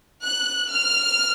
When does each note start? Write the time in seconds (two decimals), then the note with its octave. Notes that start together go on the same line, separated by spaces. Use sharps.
0.25 F#6
0.70 F6